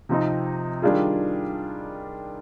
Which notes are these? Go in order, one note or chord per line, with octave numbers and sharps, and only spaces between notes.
C3 F3 C4 D#4
D#3 G3 D4 F4 G#4